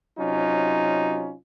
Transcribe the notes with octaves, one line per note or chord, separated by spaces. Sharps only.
C3 F#3 C#4 D#4 F4